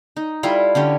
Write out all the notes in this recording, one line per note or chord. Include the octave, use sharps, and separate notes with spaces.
D#4
G3 E4 F4 A4
D3 C#4 G4